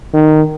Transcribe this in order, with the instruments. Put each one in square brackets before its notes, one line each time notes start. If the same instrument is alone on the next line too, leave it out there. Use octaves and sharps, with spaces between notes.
[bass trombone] D#3